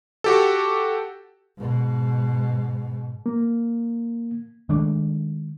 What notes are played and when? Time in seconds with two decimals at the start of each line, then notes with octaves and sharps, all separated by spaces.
0.24 F#4 G4 A4
1.57 G#2 B2
3.26 A#3
4.69 D#3 G#3 A3 D4